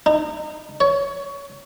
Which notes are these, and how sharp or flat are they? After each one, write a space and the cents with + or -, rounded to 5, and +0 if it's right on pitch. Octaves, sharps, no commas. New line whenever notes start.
D#4 -30
C#5 +15